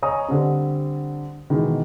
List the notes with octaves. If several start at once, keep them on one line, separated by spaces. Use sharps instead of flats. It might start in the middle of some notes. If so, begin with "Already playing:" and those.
C#5 D#5 G#5 A#5 D#6
D3 G3 C4
B2 D#3 E3 G#3